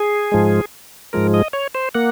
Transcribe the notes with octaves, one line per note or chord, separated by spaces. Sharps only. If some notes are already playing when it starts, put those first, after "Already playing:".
Already playing: G#4
G#2 F3 G#3
G#2 F3 G#3 A#4
D#5
C#5
C5
A#3 F#5